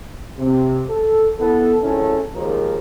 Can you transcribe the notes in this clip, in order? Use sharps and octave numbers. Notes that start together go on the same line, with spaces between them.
C3
A4
B3 E4 A4
G#1 D3 D#3 C#4 E4 A4
D#2 G#2 F3 G#3 A#4